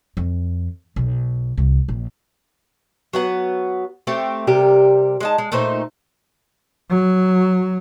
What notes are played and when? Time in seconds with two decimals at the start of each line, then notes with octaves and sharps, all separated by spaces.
0.17 F2
0.96 B1
1.57 C2
1.88 A#1
3.13 F#3 B3 F#5
4.07 A3 C4 G4
4.47 C3 G3 G4 A#4
5.20 G#3 D#4 A5
5.38 G#3
5.52 A#2 A3 D#4 C5
6.89 F#3